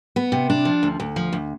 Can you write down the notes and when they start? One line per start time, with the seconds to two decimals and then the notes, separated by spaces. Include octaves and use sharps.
0.16 B3
0.32 C3
0.50 D4
0.65 F3
0.83 D2
1.00 D2
1.16 F3
1.33 D2